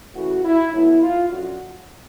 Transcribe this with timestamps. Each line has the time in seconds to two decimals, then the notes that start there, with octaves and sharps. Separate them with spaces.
0.15 C#3 E3 A3 F#4
0.44 E4
0.73 A2 F#3 B3 E4
1.02 F4
1.30 F#2 D3 F3 F#4